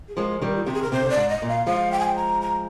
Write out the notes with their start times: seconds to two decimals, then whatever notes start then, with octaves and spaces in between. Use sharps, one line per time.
0.08 G#4
0.17 F3 G#3 A#4
0.42 D#3 G3
0.56 F4
0.65 C3 D#3 G4
0.74 G#4
0.83 A#4
0.92 C3 C5
1.00 D3
1.07 C3
1.10 D5
1.16 G#2
1.29 D#5
1.42 A#2
1.49 F5
1.67 F3 G#3 F5
1.92 G5
1.99 G#5
2.08 G5
2.16 A#5
2.42 A#5